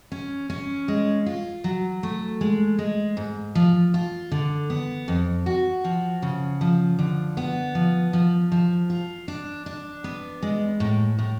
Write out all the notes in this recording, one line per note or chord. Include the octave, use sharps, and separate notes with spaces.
C#4
C#4
G#3
F4
F#3
A3
G#3
G#3
G#2
F3
F4
D3
B3
F2
F#4
F3
C#3
F3
D3
B3
F3
F3
F3
F4
D4
D4
B3
G#3
A2
A2